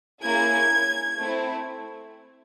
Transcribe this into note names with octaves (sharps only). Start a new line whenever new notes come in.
A#3 C#4 E4 G#4 G#6
A3 C4 E4